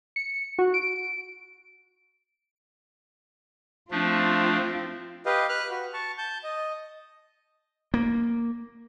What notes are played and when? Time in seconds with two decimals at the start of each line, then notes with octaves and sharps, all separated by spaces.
0.16 C#7
0.59 F#4
0.74 D7
3.91 F3 A3 C4 D4 F4
5.26 G4 B4 D#5 F5
5.49 B4 F6 F#6
5.70 F#4
5.93 A5 C#6
6.18 A5 G6
6.44 D#5
7.94 A#3